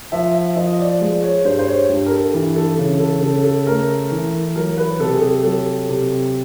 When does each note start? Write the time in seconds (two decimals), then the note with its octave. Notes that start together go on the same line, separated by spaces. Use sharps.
0.12 F3 E5
0.35 E5
0.56 F3 D#5
0.79 D5
1.01 G#3 D5
1.23 C#5
1.45 G2 C5
1.59 C5
1.68 C#5
1.89 G2
2.06 A#4
2.12 A4
2.34 E3
2.56 A4
2.78 C#3
3.00 A4
3.22 C#3 A4
3.44 A4
3.67 A3 A#4
4.11 E3
4.55 F#3 A#4
4.77 B4
4.99 C3 A4
5.14 G#4
5.22 A4
5.44 F#3 A4
5.89 C3